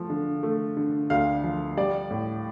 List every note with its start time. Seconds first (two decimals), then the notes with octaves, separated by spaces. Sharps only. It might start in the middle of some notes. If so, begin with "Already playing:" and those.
Already playing: F3 A3
0.10 D3
0.43 A3
0.77 D3
1.10 D2 F5
1.44 F3
1.77 G3 D5
2.10 A2